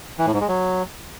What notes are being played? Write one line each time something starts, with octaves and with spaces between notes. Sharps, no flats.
E3
A2
G#2
G#3
F#3